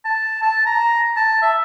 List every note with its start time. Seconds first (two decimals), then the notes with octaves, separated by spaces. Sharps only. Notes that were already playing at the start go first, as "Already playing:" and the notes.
0.05 A5
0.42 A5
0.66 A#5
1.16 A5
1.42 E5